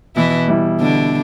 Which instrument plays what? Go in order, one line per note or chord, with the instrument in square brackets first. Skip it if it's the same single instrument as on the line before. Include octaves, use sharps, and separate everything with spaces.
[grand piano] B2 [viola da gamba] E3 E4
[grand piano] G3 E4
[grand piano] B2 [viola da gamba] D3 D4